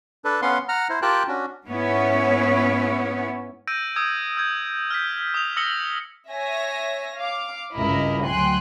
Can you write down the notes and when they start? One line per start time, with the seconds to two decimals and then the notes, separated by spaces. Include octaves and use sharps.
0.25 D4 A4 B4
0.42 B3 C#4 B4 F5 F#5 C6
0.68 F#5 A#5 F6
0.90 E4 C5
1.02 F4 G4 A#4 G5 A5 F#6
1.28 C#4 D4 F#4
1.66 G#2 B3 C#4 E4 C#5
3.67 E6 G6 A#6 D7 D#7
3.96 D#6 E6 G#6
4.37 E6 G6 G#6
4.90 F6 G6 B6
5.34 D#6 F7
5.57 D#6 E6 A#6 C#7 F#7 G7
6.30 C#5 E5 G#5 A#6
7.16 F5 D6
7.74 G#1 C#2 G2 E4 A#4 D#5
8.26 D2 F#3 G5 G#5 C6 F#6